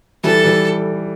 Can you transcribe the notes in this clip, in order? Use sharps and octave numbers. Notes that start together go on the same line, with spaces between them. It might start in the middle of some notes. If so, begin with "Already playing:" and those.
E3 G3 A4
E3 G3